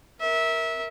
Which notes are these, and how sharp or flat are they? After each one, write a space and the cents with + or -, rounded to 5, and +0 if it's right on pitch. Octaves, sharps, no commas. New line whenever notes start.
A#4 +0 E5 -20